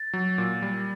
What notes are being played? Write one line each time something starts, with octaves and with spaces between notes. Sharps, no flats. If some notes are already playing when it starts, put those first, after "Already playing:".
Already playing: A6
F#3
A#2
G3